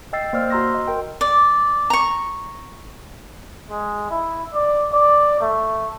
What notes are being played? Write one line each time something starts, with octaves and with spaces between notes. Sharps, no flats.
D#5 G5 E6 A6 C7
A#3 C5 D5 F6
F#4 A#5 C6 E6 A#6
C6
D#5
A#4 G5
D5
A#5 C#6
G#3
E4
D5
D5
A3